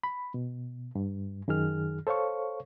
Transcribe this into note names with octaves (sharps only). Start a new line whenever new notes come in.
B5
B2
G2
F#2 D#3 G#4 F6
A4 C5 C#5 F5 C#6